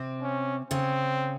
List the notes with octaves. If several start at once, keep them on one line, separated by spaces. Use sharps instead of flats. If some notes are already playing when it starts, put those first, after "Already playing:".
Already playing: C3 C4
C#4
C#3 C4 C#4